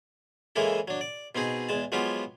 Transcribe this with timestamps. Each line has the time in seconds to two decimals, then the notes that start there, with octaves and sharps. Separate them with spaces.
0.56 C#3 E3 G#3 A#3 E4 A4
0.88 F#3 D4
1.01 D5
1.35 B2 C4 D#4 G#4
1.69 E2 G#3 A5
1.92 F3 F#3 G#3 B3 F4 G4